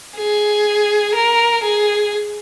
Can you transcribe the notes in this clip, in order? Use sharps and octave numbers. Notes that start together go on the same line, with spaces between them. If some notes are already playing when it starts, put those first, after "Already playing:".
G#4
A#4
G#4